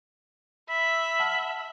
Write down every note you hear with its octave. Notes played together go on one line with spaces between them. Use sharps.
E5 B5
F#5 A5 F6